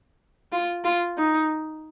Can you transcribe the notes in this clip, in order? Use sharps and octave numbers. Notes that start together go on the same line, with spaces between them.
F4
F4
D#4